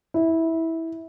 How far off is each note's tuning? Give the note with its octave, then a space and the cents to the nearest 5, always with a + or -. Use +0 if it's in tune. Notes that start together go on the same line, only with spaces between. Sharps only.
E4 -15